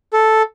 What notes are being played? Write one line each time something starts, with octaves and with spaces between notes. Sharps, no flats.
A4